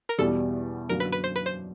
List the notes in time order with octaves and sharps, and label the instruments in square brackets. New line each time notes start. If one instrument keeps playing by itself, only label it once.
[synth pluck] A#4
[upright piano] E2 B2 G3 [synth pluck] A4
[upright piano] F#2 D3 F#3 A#3 [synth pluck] A#4
[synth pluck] B4
B4
C5
B4
C5